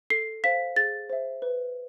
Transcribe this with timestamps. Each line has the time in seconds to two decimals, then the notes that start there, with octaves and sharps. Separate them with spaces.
0.10 A4 C7
0.44 C5 F5 B6
0.76 G#4 A6
1.10 C5 E5
1.42 B4